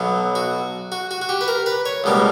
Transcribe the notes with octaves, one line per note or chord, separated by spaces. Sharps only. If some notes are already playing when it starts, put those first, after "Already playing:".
Already playing: B1 B2 F#3
F#4
F#4
F#4
F#4
G4
B4
A#4
B4
C#5
C#2 B2 G3 A#3